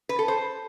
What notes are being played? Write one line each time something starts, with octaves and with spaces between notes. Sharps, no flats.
B4
A4
C5